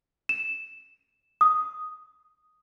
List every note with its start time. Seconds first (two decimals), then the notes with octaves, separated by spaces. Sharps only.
0.29 E7
1.41 D#6